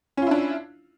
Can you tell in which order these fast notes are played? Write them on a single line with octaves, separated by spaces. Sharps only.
C#4 F4 E4 D4